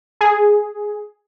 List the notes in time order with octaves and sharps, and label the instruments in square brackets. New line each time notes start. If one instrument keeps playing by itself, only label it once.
[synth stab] G#4